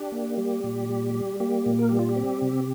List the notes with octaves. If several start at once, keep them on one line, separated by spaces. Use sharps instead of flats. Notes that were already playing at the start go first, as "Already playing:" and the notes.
Already playing: D4 G4
A#3
G3
A#2
G3
G3
A#3 G4
A#2
A#4
G3 G4
F4
G4
C4
C3